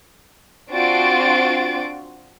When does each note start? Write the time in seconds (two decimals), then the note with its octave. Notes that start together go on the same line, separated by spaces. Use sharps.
0.72 C4 D4 F4 F#4 A6 D7